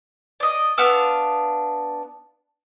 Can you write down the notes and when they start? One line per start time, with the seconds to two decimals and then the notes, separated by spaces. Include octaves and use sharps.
0.40 D5 D#5
0.77 B3 D4 F5 E6